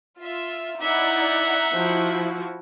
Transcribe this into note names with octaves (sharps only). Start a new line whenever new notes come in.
F4 E5
D#4 E4 D5 E5 F#5 A#5
F3 E4 F#4